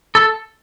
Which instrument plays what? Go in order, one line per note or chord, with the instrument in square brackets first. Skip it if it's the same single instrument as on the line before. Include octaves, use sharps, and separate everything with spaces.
[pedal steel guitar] A4